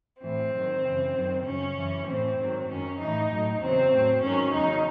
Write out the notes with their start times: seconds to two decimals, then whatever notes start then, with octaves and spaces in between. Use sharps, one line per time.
0.21 A2 E3 C4
0.53 G#2 D#3 F#3
0.83 F#2 C#3 E3
1.14 F#2 D#3 F#3
1.44 F#2 C#3 F#3 C#4
1.75 F#2 E3
2.07 A2 E3 C4
2.38 G#2 D#3 F#3
2.68 F#2 D#3 F#3 C#4
2.99 A2 E3 D#4
3.30 A2 F#3
3.61 E2 C#3 F#3 C4
3.92 A2 F#3
4.22 G#2 D#3 F#3 C#4
4.53 E2 C#3 F#3 D#4